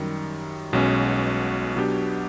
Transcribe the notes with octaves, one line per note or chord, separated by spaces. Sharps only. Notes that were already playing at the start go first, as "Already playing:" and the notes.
Already playing: F#2 D#3 G3
B1 B2 G#3 C#4
B2 F#3 B3 D4 G4